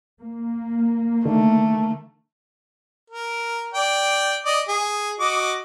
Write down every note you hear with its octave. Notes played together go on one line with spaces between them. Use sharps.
A#3
D3 D#3 A3
A#4
D5 G5
D5 D#5
G#4
F#4 D#5 D6